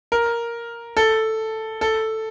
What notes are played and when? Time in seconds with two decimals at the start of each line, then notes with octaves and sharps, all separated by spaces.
0.12 A#4
0.97 A4
1.81 A4